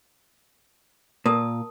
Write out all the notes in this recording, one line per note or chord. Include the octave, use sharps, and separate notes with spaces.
A#2 A#4 A5 D#6